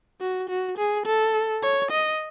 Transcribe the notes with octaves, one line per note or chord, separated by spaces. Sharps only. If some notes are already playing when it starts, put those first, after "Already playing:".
F#4
F#4
G#4
A4
C#5
D#5